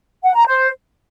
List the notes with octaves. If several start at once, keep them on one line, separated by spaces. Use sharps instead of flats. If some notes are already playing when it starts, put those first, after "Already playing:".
F#5
A#5
C5